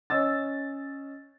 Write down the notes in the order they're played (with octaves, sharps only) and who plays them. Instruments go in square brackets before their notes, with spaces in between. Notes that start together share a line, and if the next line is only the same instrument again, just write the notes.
[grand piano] C#4 D#5 E6 A6